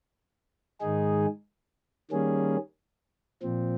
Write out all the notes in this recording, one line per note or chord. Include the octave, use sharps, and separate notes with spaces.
G#2 D#3 G#3 D#4 G#4
D#3 G3 A#3 C#4 G#4
A#2 F3 C4